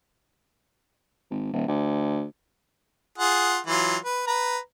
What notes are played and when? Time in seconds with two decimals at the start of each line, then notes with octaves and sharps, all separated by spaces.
1.31 G#1
1.53 D#1
1.68 D2
3.18 F4 G#4 F#5
3.66 E3 F#3 F4
4.05 B4
4.27 B4 A#5